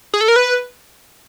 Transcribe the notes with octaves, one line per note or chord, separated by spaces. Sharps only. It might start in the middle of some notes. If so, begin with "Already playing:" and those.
G#4
A4
A#4
B4